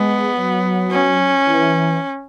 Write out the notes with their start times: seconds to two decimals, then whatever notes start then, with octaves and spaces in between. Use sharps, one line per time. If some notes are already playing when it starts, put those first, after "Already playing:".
Already playing: G#3 B3
0.36 F#3
0.91 C#4
1.47 E3